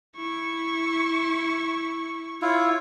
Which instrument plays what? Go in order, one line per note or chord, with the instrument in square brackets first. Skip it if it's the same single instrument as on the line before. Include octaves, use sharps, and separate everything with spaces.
[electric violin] E4 C#6
[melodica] E4 F4 [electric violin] C#5